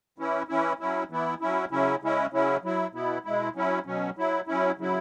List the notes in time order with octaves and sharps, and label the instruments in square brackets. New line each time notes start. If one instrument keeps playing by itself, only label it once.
[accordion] E3 C#4 E4
E3 C#4 E4
F#3 C#4 E4
E3 B3 E4
F#3 C#4 E4
C#3 F#3 C#4 E4
C#3 G#3 C#4 E4
C#3 F#3 C#4 E4
F#3 E4
B2 B3 E4
B2 G#3 E4
F#3 C#4 E4
B2 F#3 C#4
F#3 E4
F#3 C#4 E4
C#3 F#3 E4